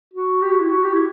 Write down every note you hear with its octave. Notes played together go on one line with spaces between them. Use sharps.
F#4
G4
F#4
E4
F#4
G4
E4